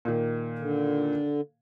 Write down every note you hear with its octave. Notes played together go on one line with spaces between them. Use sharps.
A#2 D#3
D3